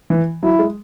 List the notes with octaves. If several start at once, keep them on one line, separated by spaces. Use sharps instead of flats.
E3
F#3 E4
G#3